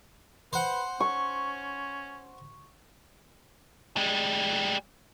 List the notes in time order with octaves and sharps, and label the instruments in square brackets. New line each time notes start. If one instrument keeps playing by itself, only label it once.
[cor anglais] B4 [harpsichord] C5 F#5
[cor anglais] C#4 [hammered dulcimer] C#6
[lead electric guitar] G3 G#3